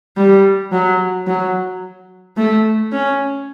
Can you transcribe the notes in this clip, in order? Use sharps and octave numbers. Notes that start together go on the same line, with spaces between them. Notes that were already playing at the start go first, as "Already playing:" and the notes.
G3
F#3
F#3
A3
C#4